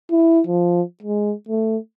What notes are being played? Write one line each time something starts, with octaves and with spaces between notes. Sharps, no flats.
E4
F3
G#3
A3